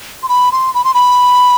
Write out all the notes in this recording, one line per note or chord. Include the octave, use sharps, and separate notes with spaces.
C6
B5
C6
B5
C6
B5